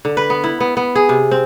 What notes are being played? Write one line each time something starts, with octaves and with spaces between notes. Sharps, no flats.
D3
B4
B3
E4
B3
B3
G#4
C3
C4